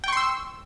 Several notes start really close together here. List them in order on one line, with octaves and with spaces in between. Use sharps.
G5 C#6 C6 E6